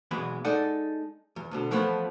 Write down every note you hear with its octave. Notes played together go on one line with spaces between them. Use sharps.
B1 E2 E3 G#3 B3 B5
G#3 D#4 A4 D5 F#5
E2
D2 B2 D3
E3 F3 A3 B3 G#4 B4